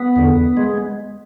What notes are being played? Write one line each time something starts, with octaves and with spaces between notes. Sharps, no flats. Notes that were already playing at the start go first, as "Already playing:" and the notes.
Already playing: B3
E2 D3
G#3